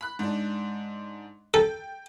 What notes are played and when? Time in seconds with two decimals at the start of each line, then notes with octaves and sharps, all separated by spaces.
0.01 B5 F#6
0.19 G#2 D4
1.54 A4 G5